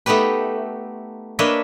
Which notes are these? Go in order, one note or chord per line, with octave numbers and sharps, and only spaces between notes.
A3 B3 D#4 G4 B4
A#3 D4 B4 C#5 D#5 E5